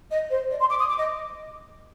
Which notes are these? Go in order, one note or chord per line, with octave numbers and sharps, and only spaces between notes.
D#5
C5
D5
C6
D6
D#6
D6
D#5